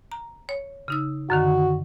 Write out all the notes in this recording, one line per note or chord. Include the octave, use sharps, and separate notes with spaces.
A#5
C#5
C#3 D#4 E6
F#2 D3 D#3 F#4